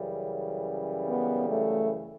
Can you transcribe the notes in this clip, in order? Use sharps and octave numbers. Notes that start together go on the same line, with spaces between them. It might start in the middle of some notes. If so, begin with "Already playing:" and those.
Already playing: F#2 C#3 E3 G3
B3
A3